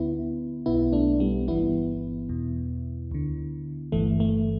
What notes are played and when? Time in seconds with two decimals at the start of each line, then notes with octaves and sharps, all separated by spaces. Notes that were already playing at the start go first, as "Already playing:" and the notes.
Already playing: D2 D3 B3 E4
0.66 B1 B2 B3 E4
0.93 A3 D4
1.20 G3 B3
1.48 G1 G2 E3 B3 E4
2.29 E2 B2
3.11 D2 D3
3.92 G1 G2 E3 A3
4.20 A3